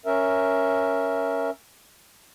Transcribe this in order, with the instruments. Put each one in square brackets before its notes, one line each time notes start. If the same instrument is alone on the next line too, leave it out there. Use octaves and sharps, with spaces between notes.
[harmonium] C#4 A#4 E5